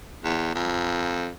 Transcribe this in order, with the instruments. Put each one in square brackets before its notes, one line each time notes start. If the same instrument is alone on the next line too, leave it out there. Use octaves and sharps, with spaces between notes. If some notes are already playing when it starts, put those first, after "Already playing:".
[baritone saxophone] E2
F2